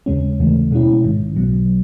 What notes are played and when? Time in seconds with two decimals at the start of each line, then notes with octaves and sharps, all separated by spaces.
0.06 D#2 C#3 G#3 C#4
0.40 D#2 C#3 E3 A3
0.71 B2 G#3 C#4 E4
1.04 A1 G#2 D#3
1.36 B1 B2 F#3